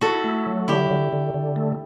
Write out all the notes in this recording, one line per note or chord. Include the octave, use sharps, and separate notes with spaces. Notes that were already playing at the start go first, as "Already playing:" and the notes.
E4 F#4 A4
A3
F#3
D3 E4 G4
D3
D3
D3
A3